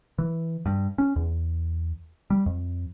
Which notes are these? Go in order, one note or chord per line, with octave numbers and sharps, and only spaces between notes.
E3
G2
C#4
E2
G3
F2